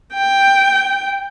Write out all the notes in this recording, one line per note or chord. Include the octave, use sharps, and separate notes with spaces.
G5